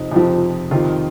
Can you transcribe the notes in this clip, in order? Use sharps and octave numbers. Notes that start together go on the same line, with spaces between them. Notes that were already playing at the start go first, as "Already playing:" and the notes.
Already playing: F2 C3 F3 D#4
F2 C3 F3
F2 C3 D#3 F4